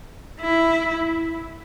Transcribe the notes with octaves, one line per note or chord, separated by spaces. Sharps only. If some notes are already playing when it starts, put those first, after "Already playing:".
E4